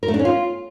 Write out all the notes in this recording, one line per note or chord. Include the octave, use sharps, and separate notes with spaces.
A#4
A3
D4
C#4
F4